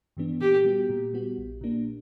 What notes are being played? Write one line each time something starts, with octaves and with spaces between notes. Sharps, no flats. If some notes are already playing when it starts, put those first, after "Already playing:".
G2 E3 B3 D4
A#2 G4
G3 B3 F#4
A#2
G3 B3 F#4
A#1
A#2 A#3 D4